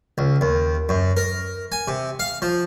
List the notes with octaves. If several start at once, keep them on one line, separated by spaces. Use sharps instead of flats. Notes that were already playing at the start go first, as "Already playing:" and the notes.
C#2
D#2
F#2
A#4
G#5
C3
F5
F3